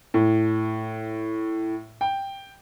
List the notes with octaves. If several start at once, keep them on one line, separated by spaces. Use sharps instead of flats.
A2
G5